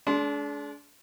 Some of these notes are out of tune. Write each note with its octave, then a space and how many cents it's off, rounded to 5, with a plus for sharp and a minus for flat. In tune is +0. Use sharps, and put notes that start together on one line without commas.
G#3 +40 D4 -30 C6 +0